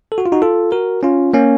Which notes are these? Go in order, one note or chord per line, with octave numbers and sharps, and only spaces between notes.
A4
F#4
F4
D#4 F#4
F4 A4
F#4 A#4
C#4 F4
A#3 C#4